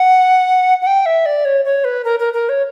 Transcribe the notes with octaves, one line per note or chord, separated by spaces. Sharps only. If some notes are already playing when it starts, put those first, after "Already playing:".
Already playing: F#5
F#5
G5
E5
D5
C#5
C#5
B4
A#4
A#4
A#4
C#5